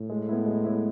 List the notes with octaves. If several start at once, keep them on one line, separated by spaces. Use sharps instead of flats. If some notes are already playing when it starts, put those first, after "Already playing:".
Already playing: A2
G#3
B3 E4
G#3
B3 E4